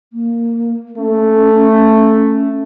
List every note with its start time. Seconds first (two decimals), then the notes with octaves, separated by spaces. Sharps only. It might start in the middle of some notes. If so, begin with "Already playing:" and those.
0.13 A#3
0.98 A3 C#4